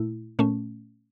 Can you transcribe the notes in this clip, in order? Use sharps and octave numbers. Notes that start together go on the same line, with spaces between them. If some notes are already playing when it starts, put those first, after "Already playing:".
Already playing: A#2 A3 E4
A#2 A3 C#4